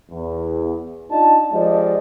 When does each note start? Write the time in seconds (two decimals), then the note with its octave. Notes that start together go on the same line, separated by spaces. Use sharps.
0.11 E2
1.11 D4 D#4 F4 A5
1.53 F3 G#3 G4 D5 D#5